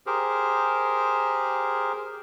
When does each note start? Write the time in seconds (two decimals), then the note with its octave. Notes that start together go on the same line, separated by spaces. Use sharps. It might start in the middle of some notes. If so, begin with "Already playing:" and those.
0.06 G4 G#4 A#4 C5